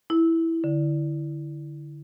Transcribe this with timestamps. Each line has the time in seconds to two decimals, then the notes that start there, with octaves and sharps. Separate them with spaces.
0.10 E4
0.64 D3